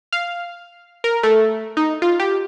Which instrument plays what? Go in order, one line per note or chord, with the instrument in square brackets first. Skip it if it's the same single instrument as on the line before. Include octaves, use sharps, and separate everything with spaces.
[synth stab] F5
A#4
A3
D#4
F4
G4